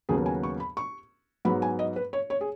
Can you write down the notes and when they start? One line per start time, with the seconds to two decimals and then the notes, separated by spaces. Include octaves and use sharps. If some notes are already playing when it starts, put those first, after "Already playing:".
0.09 D#2 C#3 F#3 B3 G#4
0.26 G#5
0.43 C#6
0.60 B5
0.77 C#6
1.45 G#2 F#3 B3 B5
1.62 G#5
1.79 D#5
1.96 B4
2.13 C#5
2.30 C#5
2.41 G#4